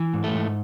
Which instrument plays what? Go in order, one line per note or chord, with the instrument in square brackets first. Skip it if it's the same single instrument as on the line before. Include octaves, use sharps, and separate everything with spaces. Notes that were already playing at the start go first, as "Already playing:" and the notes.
Already playing: [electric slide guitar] E3
G#2
A3
G#2